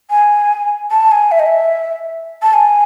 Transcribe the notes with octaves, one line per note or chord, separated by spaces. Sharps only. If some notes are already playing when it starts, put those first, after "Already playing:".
G#5
A5
G#5
E5
D#5
E5
A5
G#5